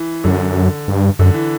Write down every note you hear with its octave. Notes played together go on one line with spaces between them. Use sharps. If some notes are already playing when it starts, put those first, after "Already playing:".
Already playing: E3
F#2 D3
G2
F#2 D3
E3